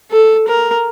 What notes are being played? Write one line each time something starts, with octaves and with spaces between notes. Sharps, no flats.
A4
A#4